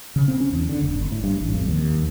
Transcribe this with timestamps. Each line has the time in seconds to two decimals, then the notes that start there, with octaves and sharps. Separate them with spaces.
0.16 C#3
0.28 C4
0.40 C#4
0.53 E2
0.69 D3
0.82 F1
0.95 G1
1.11 A2
1.24 G2
1.41 A1
1.54 F2
1.68 D#2